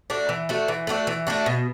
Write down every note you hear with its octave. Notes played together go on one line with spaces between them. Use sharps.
A3 D4 F#4
E3
A3 D4 F#4
E3
A3 D4 F#4
E3
A3 D4 F#4
B2